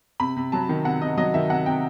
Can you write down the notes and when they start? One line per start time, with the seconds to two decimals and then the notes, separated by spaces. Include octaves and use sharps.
0.20 C3 B5
0.37 C3
0.52 F#3 A5
0.69 D#3
0.85 C3 F#5
1.01 C3 D#5
1.17 F#3 D#5
1.34 D#3 E5
1.50 C3 F#5
1.66 C3 G5